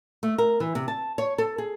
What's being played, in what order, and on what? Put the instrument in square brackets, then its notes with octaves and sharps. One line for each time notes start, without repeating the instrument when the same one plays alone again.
[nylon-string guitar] A3
A#4
E3
C3
A5
C#5
A4
G#4